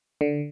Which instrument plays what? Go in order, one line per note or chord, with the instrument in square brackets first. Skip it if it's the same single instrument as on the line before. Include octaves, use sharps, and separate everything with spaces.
[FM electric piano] D3